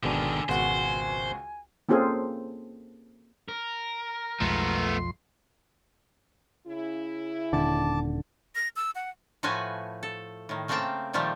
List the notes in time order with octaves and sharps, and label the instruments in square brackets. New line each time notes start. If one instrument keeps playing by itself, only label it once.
[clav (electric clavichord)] G#1 B2 D4 [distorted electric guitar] D3 D#3 [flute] G#5
[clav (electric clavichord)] G#1 B2 [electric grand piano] C#2 F#4 F#5 [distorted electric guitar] C5
[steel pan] A#3 C4 C#4 F4 G#4 A4
[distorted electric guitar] A#4
[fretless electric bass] B1 G#3 [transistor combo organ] F2 C6 [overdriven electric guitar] A3 B3
[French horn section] C#3 E4
[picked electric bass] D#1 D3 [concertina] A5 D6
[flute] A#6
E6
F#5
[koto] A2 F3 A3 F#4 B4 G#5
A4
A2 D#3
C#3 A3 A#3 C4 G5 A5
A#2 D#3 F3 G3 A3 G4